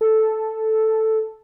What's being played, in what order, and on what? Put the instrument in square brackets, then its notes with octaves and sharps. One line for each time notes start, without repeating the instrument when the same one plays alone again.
[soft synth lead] A4